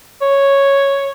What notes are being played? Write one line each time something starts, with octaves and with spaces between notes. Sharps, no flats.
C#5